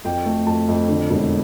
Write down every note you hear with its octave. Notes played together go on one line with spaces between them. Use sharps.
F2 G5
A3
F2 A5
F2
D3
E1